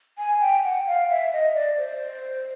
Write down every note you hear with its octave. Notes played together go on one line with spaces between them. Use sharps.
G#5
G5
F#5
F5
E5
D#5
D5
C5